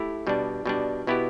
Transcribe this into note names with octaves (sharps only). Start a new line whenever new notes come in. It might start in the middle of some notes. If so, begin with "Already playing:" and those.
Already playing: A3 E4 G4
B2 G3 D4
B2 G3 D4
B2 B3 E4 G4